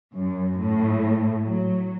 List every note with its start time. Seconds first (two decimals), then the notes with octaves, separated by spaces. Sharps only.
0.16 F#2
0.61 A2
1.46 F#3